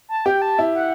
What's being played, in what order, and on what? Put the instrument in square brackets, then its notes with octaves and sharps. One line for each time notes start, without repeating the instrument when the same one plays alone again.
[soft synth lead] A5
[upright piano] G4 [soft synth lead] G5
[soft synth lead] A5
[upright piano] E4
[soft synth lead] F#5